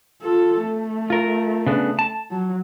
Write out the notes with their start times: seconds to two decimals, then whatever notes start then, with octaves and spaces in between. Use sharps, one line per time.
0.22 F4 A4
0.63 A3
1.10 F4 A#4
1.66 C#3 B3 D4
1.99 A5
2.31 F#3